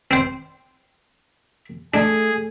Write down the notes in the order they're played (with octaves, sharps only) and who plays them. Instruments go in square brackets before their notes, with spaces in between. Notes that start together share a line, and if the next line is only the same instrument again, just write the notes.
[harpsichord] C4 C5
[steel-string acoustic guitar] A3 [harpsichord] D4 [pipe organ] G#4